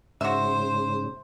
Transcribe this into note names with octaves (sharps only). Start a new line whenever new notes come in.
G#2 C#3 F#4 C5 E5